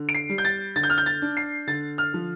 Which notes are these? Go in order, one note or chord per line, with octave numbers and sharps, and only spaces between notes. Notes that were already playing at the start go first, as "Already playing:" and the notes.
Already playing: D3
D7
C7
G3
G6
A6
D3 A6
G6
F6
G6
A6
D4
C7
D3 A6
F6
F3